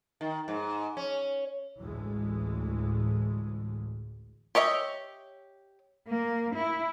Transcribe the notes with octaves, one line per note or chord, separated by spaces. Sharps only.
D#3
G#2
C#4
A1 D2 A2 E3 G#3
G4 C#5 D#5 E5
A#3
E4